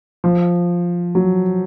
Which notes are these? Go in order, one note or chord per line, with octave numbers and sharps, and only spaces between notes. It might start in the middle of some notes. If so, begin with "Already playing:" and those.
F3
F#3